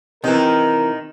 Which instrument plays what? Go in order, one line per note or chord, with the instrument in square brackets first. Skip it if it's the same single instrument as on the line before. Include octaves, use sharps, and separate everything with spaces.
[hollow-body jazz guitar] C3 E3 [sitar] D#3 D#4 [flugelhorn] A#4